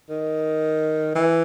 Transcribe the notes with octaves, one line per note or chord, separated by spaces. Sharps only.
D#3
E3